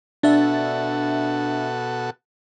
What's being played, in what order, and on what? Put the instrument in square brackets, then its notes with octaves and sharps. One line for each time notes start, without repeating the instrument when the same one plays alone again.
[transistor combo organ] B2 F#4 A4 [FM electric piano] D4 E5